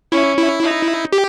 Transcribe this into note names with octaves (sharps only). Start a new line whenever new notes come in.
C#4 E4
E4
D#4
G4